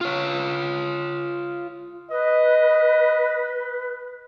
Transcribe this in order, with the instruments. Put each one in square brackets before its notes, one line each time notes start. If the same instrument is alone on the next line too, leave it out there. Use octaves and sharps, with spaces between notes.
[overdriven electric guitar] F4 C#5
[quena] B4 [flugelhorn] D#5